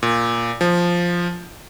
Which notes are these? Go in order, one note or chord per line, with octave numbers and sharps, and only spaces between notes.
A#2
F3